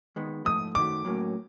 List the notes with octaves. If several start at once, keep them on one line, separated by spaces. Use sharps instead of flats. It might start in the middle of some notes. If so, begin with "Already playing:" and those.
D#3 G#3 B3
G#2 F3 A3 D#6
F#2 D#3 F#3 A3 D6
A2 F#3 A#3 C#4